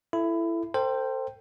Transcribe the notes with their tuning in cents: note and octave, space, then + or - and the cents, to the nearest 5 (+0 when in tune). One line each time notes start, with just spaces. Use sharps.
E4 +20 A4 +0
A4 +40 C5 +0 G5 +0